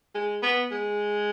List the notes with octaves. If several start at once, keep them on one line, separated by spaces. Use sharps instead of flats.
G#3
B3
G#3